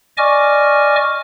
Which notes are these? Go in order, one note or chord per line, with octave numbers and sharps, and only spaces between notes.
D5 D#5 G#5 C#6 D6 F6